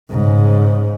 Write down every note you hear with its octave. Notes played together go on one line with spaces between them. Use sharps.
G#2 C#3